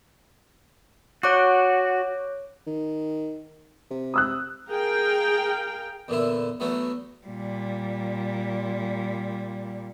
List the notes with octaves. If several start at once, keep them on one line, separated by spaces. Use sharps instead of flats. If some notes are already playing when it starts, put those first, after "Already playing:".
F#4 C#5 D6 F#6
D#3
C3
D#6 E6 F#6
G#4 A#4 F5 G5
E2 A#2 D3 E4
E2 F#3 A3 B3
A#2 G3